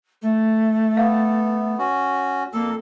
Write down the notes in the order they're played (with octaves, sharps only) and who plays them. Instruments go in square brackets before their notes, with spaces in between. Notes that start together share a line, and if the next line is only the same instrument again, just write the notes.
[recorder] A3
[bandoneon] B3 [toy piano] F5
[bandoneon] C#4 F#4
[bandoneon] F2 A4 [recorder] A#3